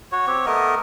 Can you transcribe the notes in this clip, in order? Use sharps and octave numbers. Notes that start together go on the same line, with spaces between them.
F#4 C#5
C4 G4 C#5
A3 B3 A#4 D#5